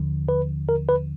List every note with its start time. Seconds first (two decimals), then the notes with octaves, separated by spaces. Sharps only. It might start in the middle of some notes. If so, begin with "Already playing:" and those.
Already playing: D#2 D3 F3
0.29 B4
0.69 A#4
0.89 B4